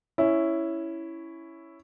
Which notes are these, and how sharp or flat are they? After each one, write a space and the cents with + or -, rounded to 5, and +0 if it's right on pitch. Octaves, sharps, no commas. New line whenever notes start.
C#4 +0 E4 +0